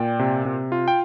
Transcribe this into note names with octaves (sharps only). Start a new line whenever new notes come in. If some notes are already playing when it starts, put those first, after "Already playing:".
Already playing: A#2 D5 G5
C3
C3
F4
G5